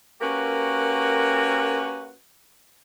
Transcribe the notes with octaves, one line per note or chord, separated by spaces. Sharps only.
A#3 C#4 F#4 G4 A#4 B4